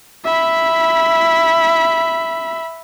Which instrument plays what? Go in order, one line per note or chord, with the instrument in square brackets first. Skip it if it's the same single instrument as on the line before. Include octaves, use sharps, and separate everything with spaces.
[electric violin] E5 B5